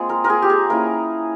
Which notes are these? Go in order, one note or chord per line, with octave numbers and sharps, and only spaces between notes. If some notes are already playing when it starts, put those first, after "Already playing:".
Already playing: G#3 A#3 C4 F4 G#4
A#4
A#4
G#4
G4
G#4
A#3 C#4 E4 A#4